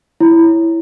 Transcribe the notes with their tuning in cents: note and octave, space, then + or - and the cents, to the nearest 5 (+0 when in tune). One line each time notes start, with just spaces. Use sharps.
E4 +0 C#5 +0